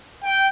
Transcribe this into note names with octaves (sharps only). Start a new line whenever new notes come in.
G5